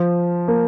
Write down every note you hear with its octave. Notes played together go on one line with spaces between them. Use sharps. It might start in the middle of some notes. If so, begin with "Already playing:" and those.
Already playing: F3
A#3